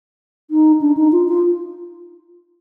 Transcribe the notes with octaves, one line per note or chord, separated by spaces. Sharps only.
D#4
D4
D#4
F4
F4